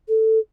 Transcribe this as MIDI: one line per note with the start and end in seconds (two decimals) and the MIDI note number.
0.09 0.39 69